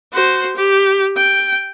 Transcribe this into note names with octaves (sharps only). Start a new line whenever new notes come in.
F#4 C5
G4
G5